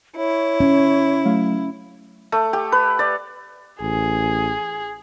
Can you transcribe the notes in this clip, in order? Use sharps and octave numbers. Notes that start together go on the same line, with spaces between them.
E4 C#5
C#4
F#3 A3 F5
A3
G4
B4
D5
A1 G#4